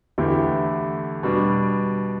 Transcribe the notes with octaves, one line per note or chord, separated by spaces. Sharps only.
E2 D3 A3 E4 G4
B2 G3 D4